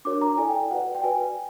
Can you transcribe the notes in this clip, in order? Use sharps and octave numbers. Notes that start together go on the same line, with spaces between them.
D4 F#4 A#4 C#5 D6
A#5
E4 A4 D5 G#5
G5
F#4 B4 D5 F#5
G5
F#4 B4 D5 G#5